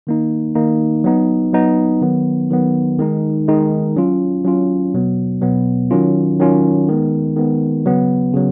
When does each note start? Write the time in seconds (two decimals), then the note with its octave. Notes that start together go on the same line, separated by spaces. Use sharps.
0.07 D#3 A#3 D#4
0.55 D#3 A#3 D#4
1.04 F#3 B3 D#4
1.53 F#3 B3 D#4
2.01 D#3 F#3 B3
2.50 D#3 F#3 B3
2.98 D#3 G#3 D#4
3.48 D#3 G#3 D#4
3.96 F#3 C#4 F4
4.44 F#3 C#4 F4
4.94 B2 F#3 B3
5.42 B2 F#3 B3
5.91 D#3 F#3 C#4 F4
6.39 D#3 F#3 C#4 F4
6.88 D#3 G#3 B3
7.36 D#3 G#3 B3
7.86 C#3 F#3 B3
8.34 C#3 F#3